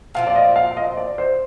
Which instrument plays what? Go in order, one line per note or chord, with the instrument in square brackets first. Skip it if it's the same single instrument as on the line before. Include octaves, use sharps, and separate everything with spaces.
[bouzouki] A#2 F3 C4 [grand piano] F5
[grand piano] D5
D#5
F5
D#5
D5
C5